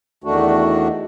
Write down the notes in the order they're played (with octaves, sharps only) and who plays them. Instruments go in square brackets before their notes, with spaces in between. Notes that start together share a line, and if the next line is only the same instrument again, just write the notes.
[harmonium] E2 D#3 A3 D4 F#4